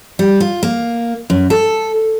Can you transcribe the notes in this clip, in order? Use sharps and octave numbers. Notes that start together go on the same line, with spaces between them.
G3
F4
A#3
F#2
A4